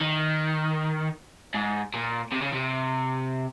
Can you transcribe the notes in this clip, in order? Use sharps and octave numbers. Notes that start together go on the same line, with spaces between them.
D#3
G#2
A#2
C3
C#3
C3